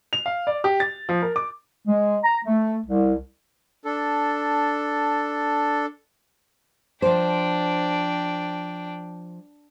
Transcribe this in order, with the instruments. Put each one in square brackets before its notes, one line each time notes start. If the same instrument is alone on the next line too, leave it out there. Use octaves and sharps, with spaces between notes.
[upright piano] F7
F5
D5
G4
A6
F3
A#4
D6
[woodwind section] G#3
A#5
A3
C2
[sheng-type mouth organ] D4 A4
[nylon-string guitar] F3 C5 [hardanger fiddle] D4 G5